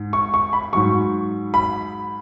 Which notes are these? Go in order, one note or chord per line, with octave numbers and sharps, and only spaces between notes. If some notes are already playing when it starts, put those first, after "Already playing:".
Already playing: G#2
C#6
C#6
B5
G#2 F#3 C#6
B5